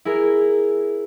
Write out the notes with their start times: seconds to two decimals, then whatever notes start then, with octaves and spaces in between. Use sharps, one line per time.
0.05 E4 G#4 A#4